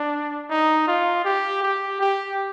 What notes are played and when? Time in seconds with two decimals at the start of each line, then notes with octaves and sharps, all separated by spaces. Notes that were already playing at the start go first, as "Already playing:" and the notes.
Already playing: D4
0.50 D#4
0.88 F4
1.25 G4
1.62 G4
2.01 G4